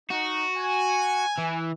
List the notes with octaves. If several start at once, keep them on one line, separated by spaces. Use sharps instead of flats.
D#4 F#4
G#5
E3